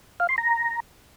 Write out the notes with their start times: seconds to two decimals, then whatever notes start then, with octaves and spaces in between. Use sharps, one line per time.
0.20 F5
0.29 C6
0.38 A#5